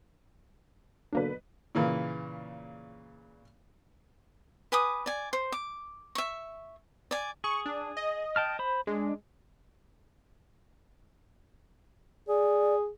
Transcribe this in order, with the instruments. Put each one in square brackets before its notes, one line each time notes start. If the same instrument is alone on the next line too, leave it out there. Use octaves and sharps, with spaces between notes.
[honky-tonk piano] B2 F#3 B4 [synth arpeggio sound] D3 A#3 D4
[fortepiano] A#2 C#3 E3 A#4
[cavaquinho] B4 G#5 D6 D#6
D5 G#5
C5
D6
E5 C#6
D5 G#5
[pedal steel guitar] G#4 [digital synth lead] C#6
[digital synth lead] D4
D#5
[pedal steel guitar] G5 A5 F6
C5 B5
[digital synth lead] G#3 [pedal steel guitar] D4
[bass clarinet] G#4 [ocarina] D5